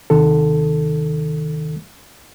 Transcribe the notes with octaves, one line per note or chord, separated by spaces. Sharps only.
D#2 C3 D#3 A4